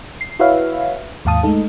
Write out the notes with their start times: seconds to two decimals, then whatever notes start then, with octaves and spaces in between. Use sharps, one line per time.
0.21 C7
0.39 E4 F#4 B4 C#5 E5 F5
1.25 D#2 G#2 F5 A5 D#6
1.43 G#3 A3 D#4 A4